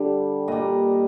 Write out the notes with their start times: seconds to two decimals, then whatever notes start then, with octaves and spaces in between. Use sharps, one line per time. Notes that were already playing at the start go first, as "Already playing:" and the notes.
Already playing: D3 G3
0.48 A#2 G3 D#5